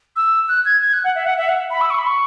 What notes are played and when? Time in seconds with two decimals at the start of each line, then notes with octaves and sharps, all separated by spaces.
0.16 E6
0.48 F#6
0.65 G#6
0.82 G#6
0.93 F#6
1.04 F#5
1.15 E5
1.26 F#5
1.38 E5
1.49 F#5
1.71 B5
1.81 E6
1.90 C#6
1.99 B5
2.06 C#6